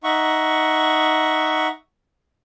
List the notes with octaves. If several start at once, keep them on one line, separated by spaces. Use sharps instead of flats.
D#4 E5 F#5 C#6